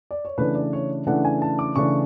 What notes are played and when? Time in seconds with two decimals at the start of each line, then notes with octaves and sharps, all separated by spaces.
0.11 D5
0.25 C#5
0.38 C#3 E3 A3 D4 B4
0.55 D5
0.73 C#5
1.07 C#3 E3 A3 D4 F#5
1.25 G#5
1.42 A5
1.59 D6
1.76 C#3 E3 A3 D4 C#6